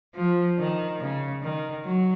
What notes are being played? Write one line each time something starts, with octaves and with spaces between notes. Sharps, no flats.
F3
D#3
C#3
D#3
F#3